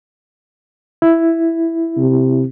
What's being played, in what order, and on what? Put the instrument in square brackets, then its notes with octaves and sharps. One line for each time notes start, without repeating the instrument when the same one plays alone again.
[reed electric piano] E4
[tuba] C3